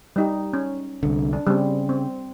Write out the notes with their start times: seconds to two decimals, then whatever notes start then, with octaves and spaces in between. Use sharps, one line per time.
0.16 G3 D#4 G4
0.53 C#4
1.03 C2 D3
1.33 D4
1.47 C#3 G3 C4
1.89 C4